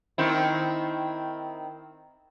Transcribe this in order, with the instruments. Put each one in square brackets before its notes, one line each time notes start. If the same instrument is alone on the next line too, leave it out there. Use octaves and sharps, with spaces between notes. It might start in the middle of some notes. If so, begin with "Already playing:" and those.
[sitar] D#3 C4 E4